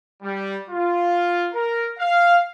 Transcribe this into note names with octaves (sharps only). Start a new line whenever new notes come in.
G3
F4
A#4
F5